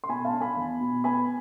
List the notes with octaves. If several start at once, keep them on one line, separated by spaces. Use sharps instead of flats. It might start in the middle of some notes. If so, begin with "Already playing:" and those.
C6
B2 G#5 B5
F5 A5
D4
G#5 B5
E2
B2
B3 G#5 B5